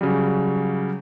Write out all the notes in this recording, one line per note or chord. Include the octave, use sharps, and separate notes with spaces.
C#3 F#3 G3